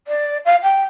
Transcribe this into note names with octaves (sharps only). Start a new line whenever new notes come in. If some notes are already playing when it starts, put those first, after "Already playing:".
D5
F5
G5